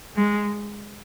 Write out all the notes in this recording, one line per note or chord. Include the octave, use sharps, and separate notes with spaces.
G#3